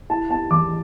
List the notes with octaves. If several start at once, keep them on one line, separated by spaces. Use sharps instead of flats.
E4 A5
B3 A5
E2 D6